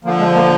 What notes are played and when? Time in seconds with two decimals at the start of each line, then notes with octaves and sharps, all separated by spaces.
0.04 D3 F3 A#3
0.19 G#3
0.35 A#3